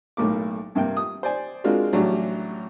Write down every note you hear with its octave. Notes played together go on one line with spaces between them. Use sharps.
B1 A2 A#3 D6
G2 C3 A#3 G5
D#6
C5 D5 G#5
G#3 C4 D4 F4 F#4 A#4
A1 F#3 G3 D4